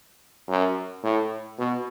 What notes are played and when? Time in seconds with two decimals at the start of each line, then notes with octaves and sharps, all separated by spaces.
0.48 F#2
1.04 A2
1.59 B2